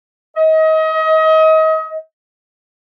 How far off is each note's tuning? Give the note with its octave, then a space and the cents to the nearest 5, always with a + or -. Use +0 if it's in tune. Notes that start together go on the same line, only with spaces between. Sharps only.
D#5 +30